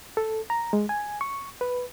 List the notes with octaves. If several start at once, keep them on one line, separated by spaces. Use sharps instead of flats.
A4
A#5
G#3
G#5
C#6
B4